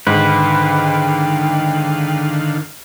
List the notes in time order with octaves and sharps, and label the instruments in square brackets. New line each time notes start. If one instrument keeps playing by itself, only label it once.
[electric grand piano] G#2 [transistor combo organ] D3 D#3 F5 [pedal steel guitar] B4 [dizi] G5